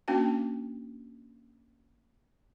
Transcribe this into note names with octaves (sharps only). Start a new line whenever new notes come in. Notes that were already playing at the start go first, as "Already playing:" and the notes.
A#3 C#4 D4 F#4 G5